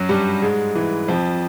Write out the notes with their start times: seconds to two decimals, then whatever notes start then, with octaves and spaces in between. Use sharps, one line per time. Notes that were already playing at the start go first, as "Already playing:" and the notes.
Already playing: F#2 F#3
0.09 G2 G3
0.42 G#2 G#3
0.75 E3
1.08 F2 F3